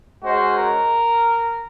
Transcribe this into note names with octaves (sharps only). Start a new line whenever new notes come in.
G#3 C#4 F#4 C5
A#4